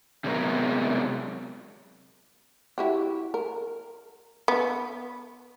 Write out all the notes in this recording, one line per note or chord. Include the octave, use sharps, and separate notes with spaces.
C3 F3 F#3 G#3 B3 A#4
E4 F#4 G4
A#4
B3